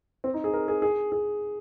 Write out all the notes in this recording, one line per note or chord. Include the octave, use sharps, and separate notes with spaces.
C4
D#4
G#4
A#4
G#4
G#4
G#4